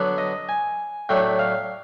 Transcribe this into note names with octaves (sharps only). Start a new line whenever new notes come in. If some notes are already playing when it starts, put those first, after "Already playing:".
Already playing: D3 F#3 B3 D4
D#5
G#5
A2 F#3 A3 D4 G5
F5